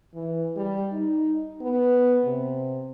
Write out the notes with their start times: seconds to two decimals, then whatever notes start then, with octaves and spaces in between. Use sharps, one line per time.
0.14 E3
0.56 G3
0.91 D#4
1.61 B3
2.24 C3